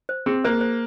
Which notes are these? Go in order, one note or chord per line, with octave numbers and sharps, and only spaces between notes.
C5
C4 G#4
A#3 C5
C5